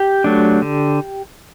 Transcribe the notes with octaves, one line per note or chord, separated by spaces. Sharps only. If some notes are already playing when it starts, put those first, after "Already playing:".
Already playing: G4
F#3 A3 D4
D3